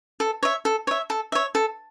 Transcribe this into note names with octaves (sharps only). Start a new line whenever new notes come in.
A4
C#5 E5
A4
C#5 E5
A4
C#5 E5
A4